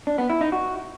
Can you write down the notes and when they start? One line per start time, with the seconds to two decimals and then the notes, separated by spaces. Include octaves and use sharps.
0.07 D4
0.18 B3
0.30 E4
0.41 D#4
0.52 F#4